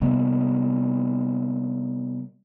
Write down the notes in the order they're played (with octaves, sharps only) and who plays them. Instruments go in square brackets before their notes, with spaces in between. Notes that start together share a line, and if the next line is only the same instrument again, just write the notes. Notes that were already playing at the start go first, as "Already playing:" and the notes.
[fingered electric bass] C3 G3 A#3 B3